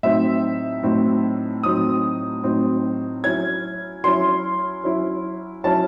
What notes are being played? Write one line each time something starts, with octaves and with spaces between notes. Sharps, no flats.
A2 F#3 C4 D#4 E5
A2 F#3 C4 D#4
A2 F#3 C4 D#4 D#6
A2 F#3 C4 D#4
F#3 C#4 E4 G#6
F#3 C#4 E4 C6
F#3 C#4 E4
F#3 C#4 E4 A5